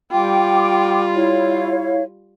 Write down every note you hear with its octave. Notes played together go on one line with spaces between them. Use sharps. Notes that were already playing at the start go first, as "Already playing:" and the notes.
G3 F4 G5 D6
E4 C#5 F5